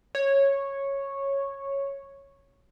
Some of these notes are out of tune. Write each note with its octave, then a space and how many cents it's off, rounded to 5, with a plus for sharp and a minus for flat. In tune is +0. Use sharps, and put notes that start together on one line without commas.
C#5 -10